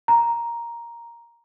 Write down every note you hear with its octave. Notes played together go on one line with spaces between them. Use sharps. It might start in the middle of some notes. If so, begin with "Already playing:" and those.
A#5